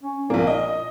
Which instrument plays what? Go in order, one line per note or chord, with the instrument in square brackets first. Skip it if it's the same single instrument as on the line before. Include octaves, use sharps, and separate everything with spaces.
[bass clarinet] C#4
[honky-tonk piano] A#1 A#3 [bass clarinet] A#2
[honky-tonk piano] D#5